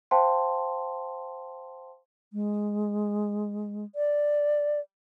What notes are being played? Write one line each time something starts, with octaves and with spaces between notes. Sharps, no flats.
C5 F5 G5 A5 C6
G#3
D5